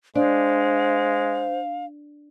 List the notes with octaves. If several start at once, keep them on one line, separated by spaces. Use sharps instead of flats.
G#3 D4 C5 F5